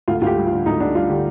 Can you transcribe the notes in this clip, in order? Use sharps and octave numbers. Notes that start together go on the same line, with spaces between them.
D2 F4
D2 F4 G4
G3
F4
D3
D2 D#4
D2 D4
G3 F4
D3 G4